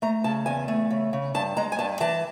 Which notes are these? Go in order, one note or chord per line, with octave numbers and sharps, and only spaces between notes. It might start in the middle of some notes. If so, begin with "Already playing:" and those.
A3 A#5
C#3 A5
E2 G#5
A3
C#3
C#3
G2 A5
G#3 A#5
G#5
G2 A5
E3 A5